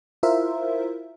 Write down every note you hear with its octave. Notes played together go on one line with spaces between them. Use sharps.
E4 F4 A#4 C5 E5